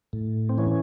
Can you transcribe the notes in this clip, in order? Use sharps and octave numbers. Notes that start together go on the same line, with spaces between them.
A2
C4
E3 C#4